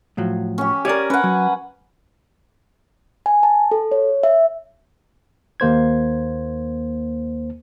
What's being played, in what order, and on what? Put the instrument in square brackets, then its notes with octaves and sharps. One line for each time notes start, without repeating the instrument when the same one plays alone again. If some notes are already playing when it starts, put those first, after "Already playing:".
[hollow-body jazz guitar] A2 F3 F#3
[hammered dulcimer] C#4 G4
[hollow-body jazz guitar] G4 C#5 D5 [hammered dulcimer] A#4 G#5
[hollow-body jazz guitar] C#4 [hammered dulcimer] B4 F#5
[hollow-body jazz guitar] F#3
[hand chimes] G#5
A5
A4
C#5
E5
[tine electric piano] D#2 A#3 C5 G#6